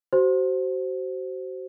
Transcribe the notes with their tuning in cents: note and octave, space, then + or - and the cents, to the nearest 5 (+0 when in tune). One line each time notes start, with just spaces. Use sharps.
F#4 +30 C5 +0